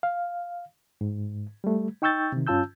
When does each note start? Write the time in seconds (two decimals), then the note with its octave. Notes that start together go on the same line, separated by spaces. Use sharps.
0.03 F5
1.01 G#2
1.64 G3 A3
2.02 D#4 G5 C#6 E6 G6 A6
2.32 C3 D#3
2.47 G2 C#4 F4 A5 E6 G6